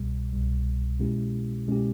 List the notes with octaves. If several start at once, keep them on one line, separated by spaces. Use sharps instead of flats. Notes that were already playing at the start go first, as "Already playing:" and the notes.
Already playing: C2 B2 G3
C2 B2 G3
B2 G#3 C#4 E4 G4
B2 G#3 C#4 E4 G4